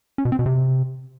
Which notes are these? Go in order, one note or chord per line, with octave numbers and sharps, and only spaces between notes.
C#4
B2
C4
B2
C3